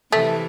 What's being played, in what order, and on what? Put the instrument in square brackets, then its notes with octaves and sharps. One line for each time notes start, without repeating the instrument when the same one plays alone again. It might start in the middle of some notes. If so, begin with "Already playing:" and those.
[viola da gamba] C3 E3 [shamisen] A3